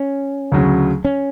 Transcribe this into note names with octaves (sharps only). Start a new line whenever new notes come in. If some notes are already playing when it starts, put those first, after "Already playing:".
Already playing: C#4
D2 C#3 F#3
C#4